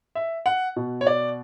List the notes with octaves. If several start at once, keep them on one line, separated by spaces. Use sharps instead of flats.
E5
F#5
B2
C#5
D5